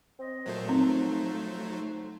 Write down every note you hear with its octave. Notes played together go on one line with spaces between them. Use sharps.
C4 D#5
A#2 F#3 A3 C5
F3 C4 D#4